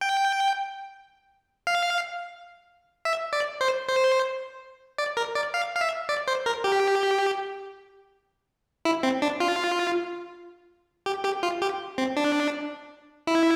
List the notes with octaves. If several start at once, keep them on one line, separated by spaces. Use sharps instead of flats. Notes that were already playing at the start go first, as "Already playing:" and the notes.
G5
F5
E5
D5
C5
C5
D5
A#4
D5
F5
F5
E5
D5
C5
A#4
G4
E4
C4
D4
F4
G4
G4
F4
G4
C4
D4
E4